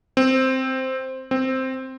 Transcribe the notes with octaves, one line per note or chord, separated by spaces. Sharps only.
C4
C4